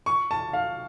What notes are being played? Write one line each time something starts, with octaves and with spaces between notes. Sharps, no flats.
C#6
A5
F5